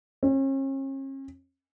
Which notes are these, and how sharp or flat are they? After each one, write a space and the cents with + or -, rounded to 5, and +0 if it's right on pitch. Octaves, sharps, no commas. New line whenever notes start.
C#4 -40